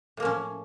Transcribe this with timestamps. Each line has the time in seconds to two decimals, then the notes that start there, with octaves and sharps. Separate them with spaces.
0.17 A2
0.20 A#3
0.22 F3
0.25 C#4